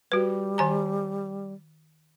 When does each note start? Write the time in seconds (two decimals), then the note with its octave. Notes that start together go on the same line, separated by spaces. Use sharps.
0.12 G3 F#4 B4
0.58 D#3 G#5 A#5